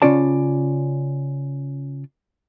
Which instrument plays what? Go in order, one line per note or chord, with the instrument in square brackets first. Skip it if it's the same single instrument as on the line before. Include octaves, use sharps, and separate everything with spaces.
[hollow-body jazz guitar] C#3 A#3 C#4 F4 D5 A5